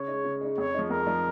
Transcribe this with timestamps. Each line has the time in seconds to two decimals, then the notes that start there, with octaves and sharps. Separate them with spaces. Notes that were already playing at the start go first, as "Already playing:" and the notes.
Already playing: C#3 C#5
0.08 G#3 D#4
0.25 C#3
0.41 G#3 D#4
0.58 F2 C#5
0.74 F3 G#3 D#4
0.90 F2 A#4
1.06 F3 G#3 D#4